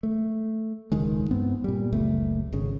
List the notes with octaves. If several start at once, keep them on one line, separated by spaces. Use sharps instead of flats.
A3
E1 C#2 D#3 G#3
G2 B3 C4
A#2 G3
F#1 C#2 A3
G#1 C#3